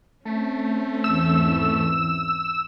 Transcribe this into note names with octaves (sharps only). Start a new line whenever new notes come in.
A3 C4 C#4
E2 G#2 E3 E6